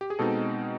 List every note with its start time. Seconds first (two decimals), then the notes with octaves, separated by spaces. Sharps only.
0.01 G4
0.10 G#4
0.19 B2 G#3 C4 D#4 A4